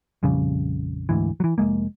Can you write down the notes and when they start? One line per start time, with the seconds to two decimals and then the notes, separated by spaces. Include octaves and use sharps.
0.23 A#1 F2 C#3 G3
1.09 D2 G#2 E3
1.40 E3 F#3
1.58 F1 C2 G#3 A#3